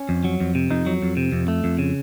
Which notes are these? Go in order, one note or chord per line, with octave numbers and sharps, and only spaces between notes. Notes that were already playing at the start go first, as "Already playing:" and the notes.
Already playing: C#4
F2
F#3
F2
C3
F2 D#4
F#3
F2
C3
F2
A3
F2
C#3